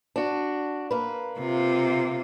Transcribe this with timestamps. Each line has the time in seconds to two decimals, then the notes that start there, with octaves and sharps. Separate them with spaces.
0.16 D4 F#4
0.91 A#3 B4
1.39 C3 F4